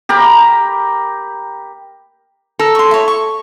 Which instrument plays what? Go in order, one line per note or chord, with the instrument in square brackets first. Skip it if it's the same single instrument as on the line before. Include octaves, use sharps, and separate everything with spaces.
[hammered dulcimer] G4 A#4 A#5 B5
[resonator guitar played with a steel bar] A4 [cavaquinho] A#4
[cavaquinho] C6 C#6
E4 C#5
C#6